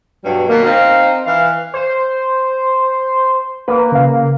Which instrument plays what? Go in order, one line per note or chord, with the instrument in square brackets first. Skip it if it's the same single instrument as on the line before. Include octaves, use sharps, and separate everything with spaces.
[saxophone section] G2 B2 F#3 G3
B2 D#3 A#3
C4 D#4 F5
E3 F5
[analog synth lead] C5
[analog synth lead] A#3 [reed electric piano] B4
[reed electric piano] C#3 F5